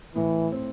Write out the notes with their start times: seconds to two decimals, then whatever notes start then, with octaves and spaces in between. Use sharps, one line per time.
0.15 A2 E3
0.52 C4